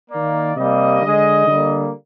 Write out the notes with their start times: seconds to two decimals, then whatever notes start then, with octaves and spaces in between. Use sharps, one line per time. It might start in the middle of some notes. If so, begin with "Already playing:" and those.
0.11 D#3 A#3 D5
0.56 C3 G3 A#3 D#5
1.02 D3 G#3
1.48 D3 G3 A#3